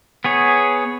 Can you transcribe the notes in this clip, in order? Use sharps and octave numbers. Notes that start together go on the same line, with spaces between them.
B3 G#4 C#5